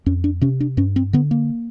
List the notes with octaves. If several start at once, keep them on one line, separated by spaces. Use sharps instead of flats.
F2 C#4
D4
C3 C#4
D4
G2 C#4
C4
D3 B3
A#3